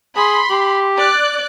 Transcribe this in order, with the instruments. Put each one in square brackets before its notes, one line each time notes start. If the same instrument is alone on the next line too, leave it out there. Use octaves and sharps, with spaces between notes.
[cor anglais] G#4 [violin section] B5 C6
[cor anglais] G4
[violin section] D5 F#6